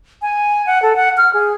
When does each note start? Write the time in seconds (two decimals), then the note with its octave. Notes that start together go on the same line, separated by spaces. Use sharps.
0.22 G#5
0.66 F#5
0.82 A4
0.96 F#5
1.18 F6
1.34 G#4